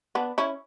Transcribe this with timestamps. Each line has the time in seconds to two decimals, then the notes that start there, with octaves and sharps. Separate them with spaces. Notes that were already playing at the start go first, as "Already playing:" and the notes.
0.15 B3 D4
0.38 C#4 E4